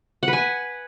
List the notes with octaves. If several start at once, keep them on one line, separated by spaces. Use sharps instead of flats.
F#5
B4
G#5